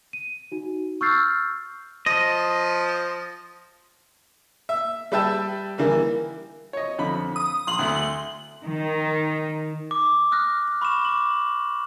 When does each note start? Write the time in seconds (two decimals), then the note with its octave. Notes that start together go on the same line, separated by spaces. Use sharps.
0.13 D#7
0.52 D#4 F#4
1.01 C#6 E6 F6 G6 A6 C7
2.06 F3 D#5
4.69 E5
5.12 G3 B4 E5 G5 A5 E6
5.78 D#3 E3 G3 A#3
6.73 C#5 D#5
6.98 F2 D3 B5
7.36 D#6
7.67 A#1 C6 F#7
7.79 D2 A3
8.65 D#3
9.91 D6
10.32 D#6 F6 F#6 A#6
10.68 F6
10.82 B5 C#6 D6 E7
11.05 D6 F#7